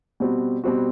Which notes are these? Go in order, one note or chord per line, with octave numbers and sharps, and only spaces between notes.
B2 G3 C4 F#4
B2 G3 C4 F#4